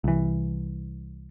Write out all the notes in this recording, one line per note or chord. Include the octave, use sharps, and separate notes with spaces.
C2 E3